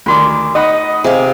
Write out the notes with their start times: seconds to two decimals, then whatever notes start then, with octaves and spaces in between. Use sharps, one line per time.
0.06 D2 D#3 F4 F#4 D5 D6
0.55 D#4 D#5 F#5 B5
1.04 C3 G4 G#4 F5